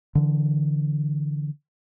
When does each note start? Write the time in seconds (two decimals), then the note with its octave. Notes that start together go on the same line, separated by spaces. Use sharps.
0.15 D3 E3